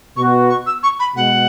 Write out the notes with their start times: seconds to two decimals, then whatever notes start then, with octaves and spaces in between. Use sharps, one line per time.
0.16 B2 B3 F#4 C#6
0.50 C#6
0.67 E6
0.83 C#6
1.00 B5
1.16 B2 G#3 F#5